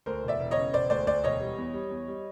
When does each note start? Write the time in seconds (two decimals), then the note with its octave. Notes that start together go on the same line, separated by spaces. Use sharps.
0.06 D2 A#4 C5
0.23 E1
0.28 D5 E5
0.40 E1
0.51 C#5 D#5
0.57 C#3
0.74 E1 C5 D5
0.90 D2 C5 D5
1.07 D2 C5 D5
1.24 E1 C#5 D#5
1.41 G3
1.58 E2
1.74 G3
1.91 E2
2.08 G3